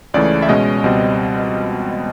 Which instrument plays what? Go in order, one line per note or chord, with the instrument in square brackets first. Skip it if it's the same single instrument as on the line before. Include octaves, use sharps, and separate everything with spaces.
[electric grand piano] C#2 C#3 E3 A3 D5
E5
B2 G#3 C#4 D#5
C#2 B2 G3 C4